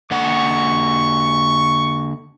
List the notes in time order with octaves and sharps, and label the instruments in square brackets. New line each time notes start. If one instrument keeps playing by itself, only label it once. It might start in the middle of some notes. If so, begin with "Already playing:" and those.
[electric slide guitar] D3 A#3 F#5 [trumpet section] C#6